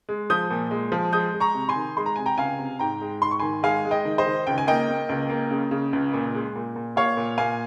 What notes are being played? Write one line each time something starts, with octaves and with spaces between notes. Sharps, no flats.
G#3
F3 D#6 G6
A#2
G#3
F3
G#3 D#6 G6
G#3
A#5 C#6
C3
G#5 C6
D#3
G#3 C6
A#5
C3 G#5
G5 A#5
C#2 F5 G#5
C3
G#2 G5 A#5
G#3
G#2 C6
C#6
D#3 G#5 C6
G#3 F5 G#5
G#3
D#5 G5
D#3
C5 D#5
D#3
C#2 G5
G#5
A#3 D#5 G5
A#3
C#2
A#3
C#3
C#3
C#2
A#2
G#3
A#2
A#2
A#2 C#5 F5
A#2
A#2 F5 G#5